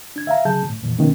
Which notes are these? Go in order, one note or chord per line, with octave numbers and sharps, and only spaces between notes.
D4 G#6
E5 F5 A#5
C#3 F#3 G#4 A5 G6
A2
F2 A#2 E3
B2 D#3 A#3 B3 C#4